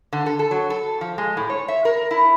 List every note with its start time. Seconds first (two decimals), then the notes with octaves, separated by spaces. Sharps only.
0.13 D3
0.26 A4
0.39 A4
0.51 F#3
0.70 A4
1.01 F3
1.18 G#3
1.37 A2
1.50 C#5
1.68 E5
1.85 A#4
2.11 E4